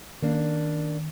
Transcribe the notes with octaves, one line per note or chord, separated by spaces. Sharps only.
D#3 A#3 C#4 D4